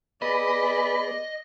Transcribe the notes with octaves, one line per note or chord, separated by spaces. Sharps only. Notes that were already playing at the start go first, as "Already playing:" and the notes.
B3 G#4 B4 D5 D#5